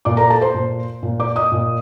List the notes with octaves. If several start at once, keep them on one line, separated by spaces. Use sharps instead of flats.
A#2 D5 D6
A#4 A#5
A4 A5
C5 C6
A#2
A#2
D5 D6
D#5 D#6
A#2